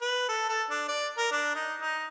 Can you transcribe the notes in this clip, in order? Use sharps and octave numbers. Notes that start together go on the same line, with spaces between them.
B4
A4
A4
D4
D5
A#4
D4
D#4
D#4